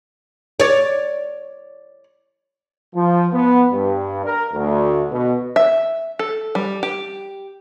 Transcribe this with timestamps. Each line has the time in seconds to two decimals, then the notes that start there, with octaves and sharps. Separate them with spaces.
0.60 C#5 D5
2.95 F3
3.33 B3
3.72 G2
4.25 A#4
4.53 D2
5.11 B2
5.56 E5
6.19 A4
6.55 G3
6.83 G4